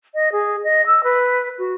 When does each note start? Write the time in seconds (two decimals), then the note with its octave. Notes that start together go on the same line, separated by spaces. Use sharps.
0.14 D#5
0.32 G#4
0.64 D#5
0.86 E6
1.04 B4
1.58 F#4